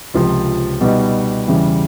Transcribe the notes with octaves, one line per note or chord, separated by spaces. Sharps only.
C#2 C3 F3
B2 G3 B3 D#4
E2 C#3 E3 G3